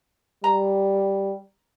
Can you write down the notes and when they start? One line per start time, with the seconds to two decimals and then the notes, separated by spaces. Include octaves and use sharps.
0.44 G3 A#5